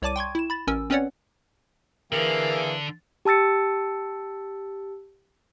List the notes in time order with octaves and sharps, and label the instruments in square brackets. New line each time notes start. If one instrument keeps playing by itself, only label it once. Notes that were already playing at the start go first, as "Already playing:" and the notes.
[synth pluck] C2 C#5 D5 A5 D6 D#7
G5 C6 C#6 G#6
E4 E7
B5 A6
A1 C#4 A#4 G#5 E6
C4 C#4 B4 C#5 D5 F#5
[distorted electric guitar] D3 [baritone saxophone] E3 [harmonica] A#3 G#4 F5 [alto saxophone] A#4
[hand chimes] G4 A5 E6 A6 C#7